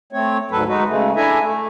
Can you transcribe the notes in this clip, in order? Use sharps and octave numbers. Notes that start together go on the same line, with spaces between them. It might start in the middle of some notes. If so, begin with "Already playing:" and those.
A3 C4 C#5
D2 G#2 F#3 A4 B4
G#3 D#4 F#4 B4
C#3 G#3 A3
D4 E4 A4 E5 G#5 A#5
A3